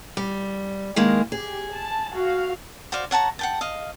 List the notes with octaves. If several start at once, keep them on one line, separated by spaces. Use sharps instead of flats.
G3
D#3 G#3 A#3
G4 G#4
A5
F#4 F5
F#4 C5 D5 F5
C#5 F#5 A5 A#5
F#5 G5 A5
D#5 F5